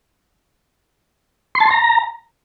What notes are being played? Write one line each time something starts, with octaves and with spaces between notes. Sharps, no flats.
C6
A5
C6
A#5